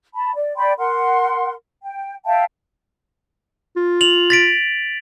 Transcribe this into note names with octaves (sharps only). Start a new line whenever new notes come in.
A5 B5
D5
D5 G5 B5 C6
A#4 F#5 C6
G5
E5 F5 G5 A5
F4
F7 F#7
A6 B6 D7